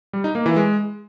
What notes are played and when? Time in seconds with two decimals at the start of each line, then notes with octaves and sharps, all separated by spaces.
0.13 G3
0.24 D#4
0.35 A#3
0.46 E3
0.56 G#3